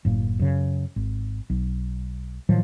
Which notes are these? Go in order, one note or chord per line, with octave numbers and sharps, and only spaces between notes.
F#1 A2 A#3
F#2 C#3
G#1
B1
A2 D#3 F3 F#3